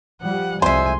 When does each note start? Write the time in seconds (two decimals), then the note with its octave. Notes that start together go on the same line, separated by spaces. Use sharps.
0.22 F3 G3 F#5
0.62 C2 F2 G#3 C5 E5 G#5 C6